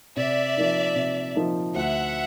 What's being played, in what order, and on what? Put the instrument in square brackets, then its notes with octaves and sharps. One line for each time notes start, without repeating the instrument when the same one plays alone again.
[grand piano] C3 [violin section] D5 E5
[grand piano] F3 A#3 D#4
C3
F3 A#3 D#4
[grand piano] D2 [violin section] E5 F#5